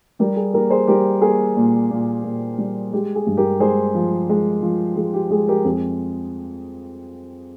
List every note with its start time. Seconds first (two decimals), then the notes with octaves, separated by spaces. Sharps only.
0.19 G3 G4 A#4
0.36 G#4
0.53 A#3 G4 A#4
0.70 G#4 C5
0.87 G3 G4 A#4
1.22 A#3 G#4
1.57 A#2
1.91 A#2
2.24 A#2
2.58 G3
2.93 G#3 G4
3.15 G#4
3.27 G2
3.37 G4 A#4
3.60 G#3 G#4 C5
3.95 F3
4.29 G#3
4.63 F3
4.96 F3 G#4
5.14 G4
5.31 G#3 G#4
5.48 G4 A#4
5.64 F2 G#4